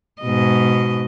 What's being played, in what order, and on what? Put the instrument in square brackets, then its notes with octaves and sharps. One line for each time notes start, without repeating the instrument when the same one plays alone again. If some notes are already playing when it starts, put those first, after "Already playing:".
[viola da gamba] G#2 B2 D#5